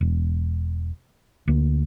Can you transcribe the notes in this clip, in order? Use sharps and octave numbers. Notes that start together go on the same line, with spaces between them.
E1
D2 A#3